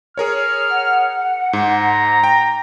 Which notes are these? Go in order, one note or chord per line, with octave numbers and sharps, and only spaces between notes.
G#4 A#4 C#5 F6
F#5
G#2 A#5
G5